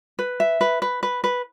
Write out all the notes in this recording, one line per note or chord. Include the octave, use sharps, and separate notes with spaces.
B4
E5
B4
B4
B4
B4